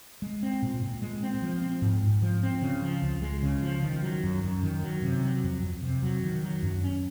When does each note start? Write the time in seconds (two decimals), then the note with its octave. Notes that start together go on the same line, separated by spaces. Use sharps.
0.22 G#3
0.43 C4
0.62 A#2
0.83 A#2
1.02 G#3
1.23 C4
1.42 F3
1.62 C4
1.82 G#2
2.03 G#2
2.22 F3
2.43 C4
2.62 C#3
2.82 F3
3.02 C#2
3.22 G#3
3.43 C#3
3.63 F3
3.82 D#3
4.02 F#3
4.23 F#2
4.43 F#2
4.63 D#3
4.83 F#3
5.02 C3
5.23 F#3
5.43 F2
5.63 F2
5.82 C3
6.02 F#3
6.23 D#3
6.43 F#3
6.63 F#2
6.84 C#4